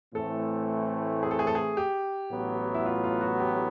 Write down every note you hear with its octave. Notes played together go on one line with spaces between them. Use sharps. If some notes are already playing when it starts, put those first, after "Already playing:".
A2 E3 A3 C4 A4
G#4
A4
G#4
A4
G#4
G4
A1 A2 F#3 B3
E4
F4
F4
F#4
G4